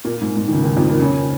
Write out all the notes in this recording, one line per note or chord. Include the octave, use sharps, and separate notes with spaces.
A#2 A#3
G#2
G#2
D#3
C#2 C#3
D#2 D#3
F2 F3
A#2 A#3
C#3 C#4